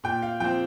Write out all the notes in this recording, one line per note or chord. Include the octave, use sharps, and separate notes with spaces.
A#2 G5
F5
F3 C4 G5